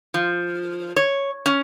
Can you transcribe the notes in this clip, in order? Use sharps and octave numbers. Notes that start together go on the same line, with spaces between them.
F3
C#5
C#4